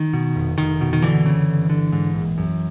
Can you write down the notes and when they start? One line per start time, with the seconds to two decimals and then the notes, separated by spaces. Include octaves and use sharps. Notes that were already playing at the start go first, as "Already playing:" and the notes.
Already playing: D#3
0.13 B2
0.36 F1
0.58 F1 D#3
0.81 B2
0.93 D#3
1.02 F#1 D3 E3
1.26 C#3
1.48 G1
1.70 D3
1.92 G#2
2.14 A#1
2.38 F#2